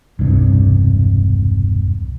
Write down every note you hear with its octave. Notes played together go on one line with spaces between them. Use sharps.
E1 C2 G2 C3